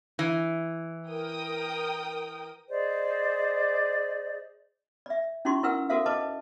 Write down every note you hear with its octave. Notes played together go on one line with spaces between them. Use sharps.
E3
A#4 G5 D#6
G#4 C5 D5 D#5
D5 E5
C#4 D#4 E4 F#4 C6 C#6
E4 A#4 B4 F#5 E6
F#4 A4 A#4 C5 E5 F5
B4 C5 D#5 A5 D6